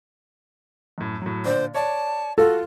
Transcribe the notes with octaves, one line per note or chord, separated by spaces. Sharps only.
F#2 A2
A2 F#3
A#2 D3 C5 D5
C#5 D5 A5
F4 F#4 A4